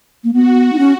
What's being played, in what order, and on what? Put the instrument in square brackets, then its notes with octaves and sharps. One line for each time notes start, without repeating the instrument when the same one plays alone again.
[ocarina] A#3
[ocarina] B3 [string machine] F#4
[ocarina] D#4
C#4